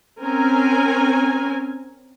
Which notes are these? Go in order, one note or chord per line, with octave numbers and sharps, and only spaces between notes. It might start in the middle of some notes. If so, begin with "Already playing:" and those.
C4 C#4 A#4 G#5